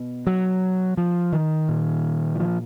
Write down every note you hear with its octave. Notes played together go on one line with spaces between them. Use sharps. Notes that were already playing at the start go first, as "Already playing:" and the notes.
Already playing: B2
F#3
F3
D#3
A#2
E3
F3